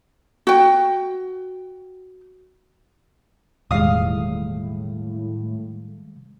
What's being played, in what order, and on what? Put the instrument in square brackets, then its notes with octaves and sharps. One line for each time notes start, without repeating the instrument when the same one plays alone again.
[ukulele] F#4 G5
[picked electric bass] E1 [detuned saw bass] A2 [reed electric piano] D#3 G3 G#3 [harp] F5 D#6